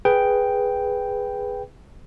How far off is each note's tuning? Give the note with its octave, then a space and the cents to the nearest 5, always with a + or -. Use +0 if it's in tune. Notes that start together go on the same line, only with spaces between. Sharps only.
G#4 +0 B4 +0 G5 +0